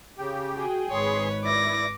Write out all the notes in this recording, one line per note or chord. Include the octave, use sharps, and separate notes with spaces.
C#3 G4
F#4 G#4 G5
G#1 G#4 B4 C#5 C6
E4 D5 D6 A#6